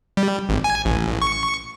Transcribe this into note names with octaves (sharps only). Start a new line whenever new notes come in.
G3
G#1
G#5
A1
C#6